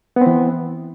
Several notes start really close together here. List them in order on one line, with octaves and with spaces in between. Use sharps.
B3 C4 E3